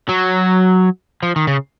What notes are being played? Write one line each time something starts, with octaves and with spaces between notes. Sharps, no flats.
F#3
F3
D#3
C#3